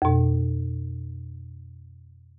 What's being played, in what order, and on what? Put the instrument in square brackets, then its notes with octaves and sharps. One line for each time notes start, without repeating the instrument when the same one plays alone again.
[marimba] F2 B2